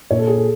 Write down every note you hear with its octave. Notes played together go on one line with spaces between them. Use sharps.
A#2 C#5
A4
G#4
A4